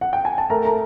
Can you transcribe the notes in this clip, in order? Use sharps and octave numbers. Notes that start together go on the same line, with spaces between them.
F#5
G5
G#5
A5
A3 A#4 A#5
A#5